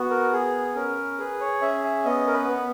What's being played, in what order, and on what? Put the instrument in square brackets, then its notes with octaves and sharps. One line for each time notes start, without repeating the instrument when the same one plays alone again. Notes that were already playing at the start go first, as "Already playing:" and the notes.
Already playing: [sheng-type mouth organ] B3 F#4
A#4
G#4
C#4 A#4
G#4 B4
C#5
C#4 E5
E5
B3 D#5
A#4
B4
B3